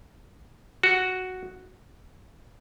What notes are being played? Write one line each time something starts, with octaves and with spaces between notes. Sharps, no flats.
F#4